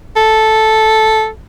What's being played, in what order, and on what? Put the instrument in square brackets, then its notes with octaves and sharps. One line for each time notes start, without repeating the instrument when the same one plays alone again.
[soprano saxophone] A4